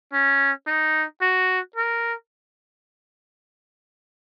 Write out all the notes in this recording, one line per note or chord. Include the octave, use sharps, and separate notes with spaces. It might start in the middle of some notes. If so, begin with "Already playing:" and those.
C#4
D#4
F#4
A#4